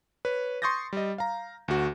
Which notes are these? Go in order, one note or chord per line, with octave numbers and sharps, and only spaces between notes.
B4 C#5
C6 C#6 D#6 G6 A6 A#6
G3 D#5
F5 A#5
D2 F#4